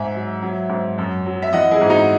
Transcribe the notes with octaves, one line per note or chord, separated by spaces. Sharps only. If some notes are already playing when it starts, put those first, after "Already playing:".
Already playing: G#2 E5 G#5
F#3
F#3
G#2
F#2
F#3
E5
E3 D#5 F#5
E4 G#4
G#2
D#4 F#4